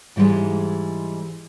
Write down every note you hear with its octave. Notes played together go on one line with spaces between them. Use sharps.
G#2 E3 G3 G#3